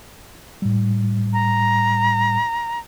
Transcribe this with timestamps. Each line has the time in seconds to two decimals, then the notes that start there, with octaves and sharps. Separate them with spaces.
0.62 A2 G3
1.33 A#5